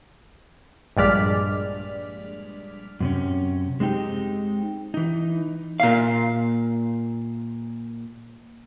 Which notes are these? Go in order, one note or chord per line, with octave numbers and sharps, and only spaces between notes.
A#1 G2 G#3 D5 F6 B6
F#2 C3 C#4
G#3 C4 D#4 G4
E3 D#4
A#2 F5